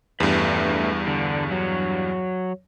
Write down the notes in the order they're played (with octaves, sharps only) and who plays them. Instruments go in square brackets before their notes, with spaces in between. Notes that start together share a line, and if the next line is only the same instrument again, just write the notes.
[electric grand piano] E2 G2 [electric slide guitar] A3 G4 B4
[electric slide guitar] D3
F#3